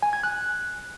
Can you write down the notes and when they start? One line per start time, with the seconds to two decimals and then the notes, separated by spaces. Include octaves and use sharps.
0.02 G#5
0.13 G#6
0.23 F#6